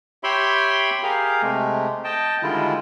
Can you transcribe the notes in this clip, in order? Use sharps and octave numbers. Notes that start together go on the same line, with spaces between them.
G4 C#5 E5 G5 B5 C6
G4 G#4 A#4 F5
C3 G#3 A3
D#5 G5 A5
D3 D#3 G3 G#3 E4 F4